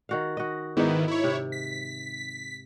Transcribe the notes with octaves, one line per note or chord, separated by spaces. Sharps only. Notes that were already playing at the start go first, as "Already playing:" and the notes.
D#3 F#4 F5
F#4 D#5
G#2 D#3 B3 D#4 E4
E4 C#5
C3
B6